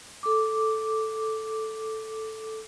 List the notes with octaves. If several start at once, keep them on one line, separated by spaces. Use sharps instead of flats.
A4 D6